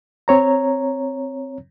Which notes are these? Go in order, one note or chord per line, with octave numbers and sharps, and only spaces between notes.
C4 C#5 A#5